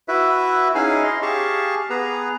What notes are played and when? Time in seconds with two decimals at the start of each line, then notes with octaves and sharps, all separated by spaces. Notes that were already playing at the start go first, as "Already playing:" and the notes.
0.08 E4 F#4 B4 E5
0.75 C#4 D#4 E4 G#4 F5 G#5
1.04 D#5 C6
1.22 G4 G#4 F5 A5 C#6
1.90 B3 G#4 B4 A#5